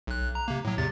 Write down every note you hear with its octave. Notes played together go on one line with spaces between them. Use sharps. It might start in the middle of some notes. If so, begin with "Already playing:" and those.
B1 F#6
A#5
C3 A#3
A2 F#3
E2 C3 A6